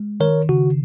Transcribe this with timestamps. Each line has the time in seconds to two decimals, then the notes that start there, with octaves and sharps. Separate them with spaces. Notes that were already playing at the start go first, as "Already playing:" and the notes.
Already playing: G#3
0.20 D#3 A#4 C#5
0.49 C#3 F#4